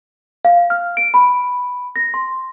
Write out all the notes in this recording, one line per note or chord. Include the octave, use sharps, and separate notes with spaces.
F5
F6
D7
B5
A#6
C6